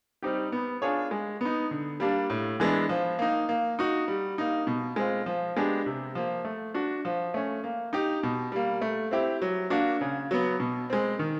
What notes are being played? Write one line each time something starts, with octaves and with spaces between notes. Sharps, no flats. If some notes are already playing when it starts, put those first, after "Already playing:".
G3 C4 D#4 G4
B3
D4 F4 G#4 C#5
G#3
B3 D#4
D3
G3 A#3 D4
A2
E3 G#3 B3 D4
F3
A#3 D#4
A#3
D#4 F#4
G3
A#3 D#4
B2
G#3 C4 F4
F3
G#3 B3 D4 G4
C3
F3 A#3
A3
D4 F#4
F3
A3 C#4
A#3
D#4 G4
B2
G3 A#3
A3
C4 E4 G4
F#3
A#3 D4 F#4
C#3
F#3 B3
B2
G#3 C4
D#3